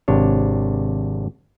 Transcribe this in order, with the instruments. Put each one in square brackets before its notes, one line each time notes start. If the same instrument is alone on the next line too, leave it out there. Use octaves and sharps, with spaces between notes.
[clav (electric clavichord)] G#1 C3 D4 C#5